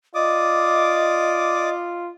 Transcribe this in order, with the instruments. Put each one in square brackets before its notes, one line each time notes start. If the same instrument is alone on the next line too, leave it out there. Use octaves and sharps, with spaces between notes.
[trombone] F4 [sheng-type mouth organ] D5 D6 D#6 [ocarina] D#5